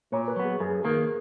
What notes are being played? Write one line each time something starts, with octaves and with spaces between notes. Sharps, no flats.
A#2 C#5
B4
F#3 B3
G#4
F#2 G#4
G#4
D#3 A#3 A#4